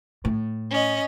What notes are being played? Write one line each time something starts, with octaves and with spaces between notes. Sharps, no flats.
A2
C#4 D#5